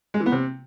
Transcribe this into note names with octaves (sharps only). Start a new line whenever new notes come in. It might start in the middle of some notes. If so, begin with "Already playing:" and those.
G#3
E3
B3
C3